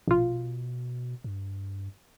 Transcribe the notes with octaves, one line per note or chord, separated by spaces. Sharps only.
A#1 B2 F4
G2